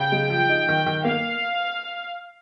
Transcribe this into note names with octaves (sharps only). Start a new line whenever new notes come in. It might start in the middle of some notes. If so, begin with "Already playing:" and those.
Already playing: C#3 G5
G#3
F3
D#4
D#3
D#3
A#3 F5